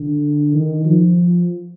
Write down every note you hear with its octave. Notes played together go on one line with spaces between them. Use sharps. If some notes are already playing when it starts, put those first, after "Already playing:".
Already playing: D3
D#3
F3